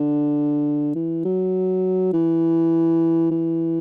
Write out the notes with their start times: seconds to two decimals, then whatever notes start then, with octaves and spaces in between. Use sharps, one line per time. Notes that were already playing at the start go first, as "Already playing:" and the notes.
Already playing: D3
0.95 E3
1.25 F#3
2.13 E3
3.31 E3